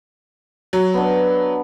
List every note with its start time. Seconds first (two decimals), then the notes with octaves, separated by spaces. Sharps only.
0.73 F#3
0.94 B3 D4